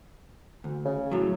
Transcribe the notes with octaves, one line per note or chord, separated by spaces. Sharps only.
D2
C#3
A2 F#3